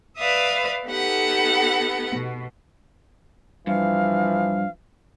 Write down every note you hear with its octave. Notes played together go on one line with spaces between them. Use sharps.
B4 D5 E5 F5 D#6
B3 D#4 G4 A4 F#5 B5
B2
G2 E3 F3 F5